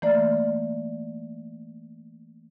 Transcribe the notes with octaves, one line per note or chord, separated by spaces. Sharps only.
E3 A3 A#3 D5